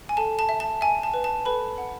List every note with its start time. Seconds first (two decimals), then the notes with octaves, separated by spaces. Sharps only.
0.09 G#5
0.17 A4 A5
0.39 A5
0.49 E5
0.60 A5
0.81 E5 G#5
1.03 A5
1.14 B4
1.24 A5
1.45 A4 B4 B5
1.78 F#5